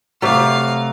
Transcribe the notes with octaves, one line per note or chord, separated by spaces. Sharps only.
C3 F#3 A3 F5